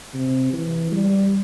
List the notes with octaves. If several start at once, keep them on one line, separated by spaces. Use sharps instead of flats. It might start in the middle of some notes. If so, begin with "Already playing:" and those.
C3
E3
G3